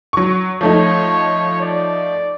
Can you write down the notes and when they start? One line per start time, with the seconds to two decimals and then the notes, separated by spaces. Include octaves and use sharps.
0.13 F#3 C#6
0.61 F3 A3 D#4 C#5
1.61 D5